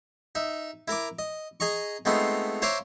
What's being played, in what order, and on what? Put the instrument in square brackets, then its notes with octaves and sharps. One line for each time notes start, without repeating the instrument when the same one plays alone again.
[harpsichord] D#4 E5
E4 A#4 A#5 D6
D#5
G#4 D#5 A#5 C#6
G#3 A3 B3 C4 D#4 F4
C5 C#5 E5 F5 A#5 D6